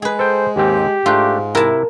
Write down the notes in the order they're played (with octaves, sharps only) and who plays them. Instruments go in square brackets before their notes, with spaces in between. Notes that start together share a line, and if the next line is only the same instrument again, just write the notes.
[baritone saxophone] G#3 [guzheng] G#4 B4
[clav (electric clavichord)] A4 G5 [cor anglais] C5
[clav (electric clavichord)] D#2 G#2 C4 [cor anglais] G4
[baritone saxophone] G#2 [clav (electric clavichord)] A3 D4 [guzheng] F4
[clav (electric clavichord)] C3 E4 [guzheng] A#4 A5